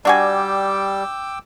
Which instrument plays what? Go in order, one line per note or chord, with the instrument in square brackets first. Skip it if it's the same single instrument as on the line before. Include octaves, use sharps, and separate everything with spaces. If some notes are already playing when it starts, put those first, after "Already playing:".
[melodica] G3 [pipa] D4 F#4 G#5 [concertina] G5 D6 E6